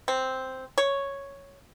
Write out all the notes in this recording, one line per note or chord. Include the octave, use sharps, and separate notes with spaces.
C4
C#5